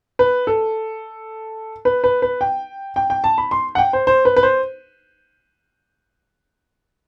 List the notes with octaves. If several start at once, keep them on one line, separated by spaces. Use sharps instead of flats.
B4
A4
B4
B4
B4
G5
G5
G5
A5
B5
C6
F#5
G5
C5
C5
B4
B4
C5